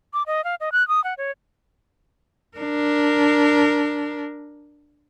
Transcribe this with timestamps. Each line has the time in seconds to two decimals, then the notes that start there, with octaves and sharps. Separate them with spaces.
0.14 D6
0.27 D#5
0.44 F5
0.60 D#5
0.72 F#6
0.88 D#6
1.04 F#5
1.18 C#5
2.57 D4 A#4